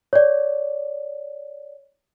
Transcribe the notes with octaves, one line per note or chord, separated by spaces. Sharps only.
C#5 D5